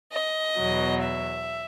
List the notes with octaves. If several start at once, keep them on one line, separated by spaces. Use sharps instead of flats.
D#5
E2 B2 F#3
E5